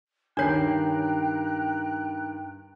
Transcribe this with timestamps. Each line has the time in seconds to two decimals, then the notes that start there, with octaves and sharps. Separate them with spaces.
0.37 G2 D#3 D4 C#5 G5 A#5 F#6 C7